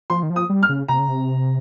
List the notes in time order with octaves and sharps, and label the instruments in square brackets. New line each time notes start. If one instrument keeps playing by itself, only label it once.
[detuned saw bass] F3 [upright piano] C6
[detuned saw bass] D#3
F3
[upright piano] D#6
[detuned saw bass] G3
[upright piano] F6
[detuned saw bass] C#3
[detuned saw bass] C3 [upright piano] A#5
[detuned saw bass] C#3
C3